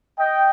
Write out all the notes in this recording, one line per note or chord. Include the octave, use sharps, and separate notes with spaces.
D#5 G5